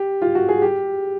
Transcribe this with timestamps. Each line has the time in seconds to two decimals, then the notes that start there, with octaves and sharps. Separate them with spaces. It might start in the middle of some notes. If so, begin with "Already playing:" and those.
Already playing: G4
0.22 F4
0.35 F#4
0.49 G#4
0.62 G4